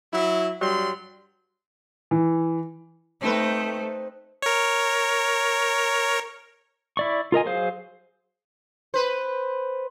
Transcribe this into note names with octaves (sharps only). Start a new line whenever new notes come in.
F#3 E4
G2 F#3 G3 C6
E3
A3 C4 D#4 B4
A#4 C#5
E4 D5 C#6
F4 A#4 D#5 G#5
F#3 G#4 C5 F5
B4 C5